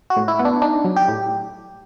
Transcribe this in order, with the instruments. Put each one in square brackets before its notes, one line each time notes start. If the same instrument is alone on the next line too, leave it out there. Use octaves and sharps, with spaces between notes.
[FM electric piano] F#4
[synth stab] A2
[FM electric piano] E4
[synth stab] B3
[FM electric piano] D4
[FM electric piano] D4 [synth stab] D#4
[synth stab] F#3
[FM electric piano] G4
[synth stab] A2